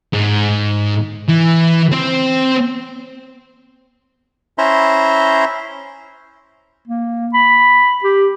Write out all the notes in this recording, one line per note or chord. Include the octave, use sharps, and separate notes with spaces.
G#2
E3
C4 C5
C#4 E4 C5 E5 A#5 C6
A#3
B5
G4